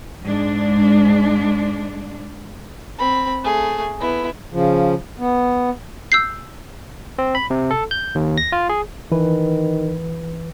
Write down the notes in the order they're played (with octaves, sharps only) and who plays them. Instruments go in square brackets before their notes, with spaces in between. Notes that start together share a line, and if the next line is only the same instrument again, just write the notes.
[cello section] G#2 G#3 D4
[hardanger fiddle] C4 B5
A3 G#4
B3 E4
[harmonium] C#3 F3
B3
[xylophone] E6 G6 C7
[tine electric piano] C4
B5
C3
A4
G6
D#2
A#6
F4
G#4
[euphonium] D#3 [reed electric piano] E3 B4